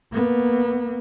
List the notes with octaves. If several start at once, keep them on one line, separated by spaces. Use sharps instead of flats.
A#3 B3